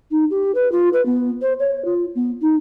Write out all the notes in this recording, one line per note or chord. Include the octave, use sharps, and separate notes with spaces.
D#4
G4
B4
F4
B4
B3
C5
C#5
F4
B3
D#4